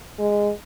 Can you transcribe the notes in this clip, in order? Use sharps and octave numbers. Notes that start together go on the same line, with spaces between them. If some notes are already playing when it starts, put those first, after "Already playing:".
G#3